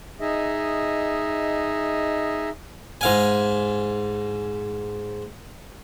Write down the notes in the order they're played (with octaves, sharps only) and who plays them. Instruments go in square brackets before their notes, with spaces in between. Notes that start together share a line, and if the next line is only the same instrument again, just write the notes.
[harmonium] D#4 G#4 D#5 E5
[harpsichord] G#2 F5 G#5